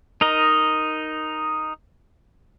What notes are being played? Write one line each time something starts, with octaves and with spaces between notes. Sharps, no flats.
D#4 A#4 D#5